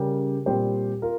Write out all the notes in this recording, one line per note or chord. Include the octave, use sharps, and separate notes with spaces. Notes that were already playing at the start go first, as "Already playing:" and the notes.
Already playing: C#3 G3 C#4 G4 A#4
A#2 G3 C4 G4 C5
F4 A#4